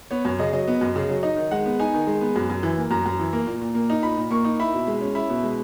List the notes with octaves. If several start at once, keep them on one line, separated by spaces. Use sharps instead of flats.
B3 C#5
F#2 C#5
C#3 D#5
F#3 D#5
B3
F#2
C#3
F#3
D#4 D#5
D#3
G#3 F#5
B3
D#4 G#5
D#3
G#3
B3
F#2
F#2
E3
A#3
F#2 A#5
F#2
E3
A#3
A#2
A#2
A#3
D#4
A#2 B5
A#2
A#3 C#6
D#4
E4 B5
B2
G#3
C#4
E4 B5
B2
G#3